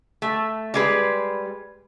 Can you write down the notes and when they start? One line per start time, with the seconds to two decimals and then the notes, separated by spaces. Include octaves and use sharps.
0.22 A3
0.74 G3 G#3 B4